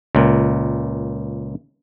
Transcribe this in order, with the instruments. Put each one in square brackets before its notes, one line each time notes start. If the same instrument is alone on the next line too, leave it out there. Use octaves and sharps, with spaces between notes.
[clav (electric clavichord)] C#2 A#2